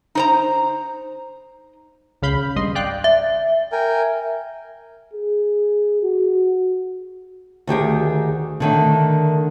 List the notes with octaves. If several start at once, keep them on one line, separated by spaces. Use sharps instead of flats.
D#4 C5 A#5
C#2 C#3 F5 B5 G6
G#1 G2 D#5 C6
D5 F5 G5 F#6
E5
A#4 G5 G#5
G#4
F#4
D2 D#3 G4 G#4
D3 D#3 A3